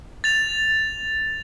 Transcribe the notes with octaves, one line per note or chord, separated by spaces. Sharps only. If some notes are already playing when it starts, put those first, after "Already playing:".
A6 F7